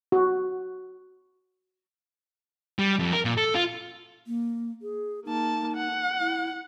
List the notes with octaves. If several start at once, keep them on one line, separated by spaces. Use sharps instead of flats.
F#4
G3
F2
A#4
A#2
A4
F4
A#3
G#4
A#3 D#4 A5
F#5
E4